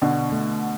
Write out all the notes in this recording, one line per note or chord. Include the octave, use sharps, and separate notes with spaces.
B2 D3 D4
A3